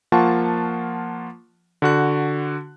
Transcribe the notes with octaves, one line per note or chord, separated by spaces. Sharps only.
F3 A#3 F4 F#5 A5 C#6
D3 F#4 F#6